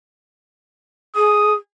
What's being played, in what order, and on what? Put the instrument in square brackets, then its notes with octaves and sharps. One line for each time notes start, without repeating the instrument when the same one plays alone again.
[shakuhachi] G#4 [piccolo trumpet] D#6